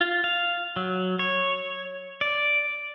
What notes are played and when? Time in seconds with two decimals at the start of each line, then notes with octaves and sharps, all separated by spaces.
0.01 F4
0.24 F5
0.76 F#3
1.19 C#5
2.21 D5